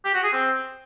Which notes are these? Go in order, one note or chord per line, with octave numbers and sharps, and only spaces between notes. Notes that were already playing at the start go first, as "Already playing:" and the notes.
G4
F#4
G#4
C4